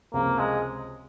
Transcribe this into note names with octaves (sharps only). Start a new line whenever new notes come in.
C#2 C3 F3 A#3
G#3